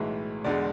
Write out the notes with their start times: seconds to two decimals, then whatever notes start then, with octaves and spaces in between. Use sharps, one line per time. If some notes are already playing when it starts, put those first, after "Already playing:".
Already playing: B1 A2 E3 G#3
0.44 E1 E2 D3 G#3 D5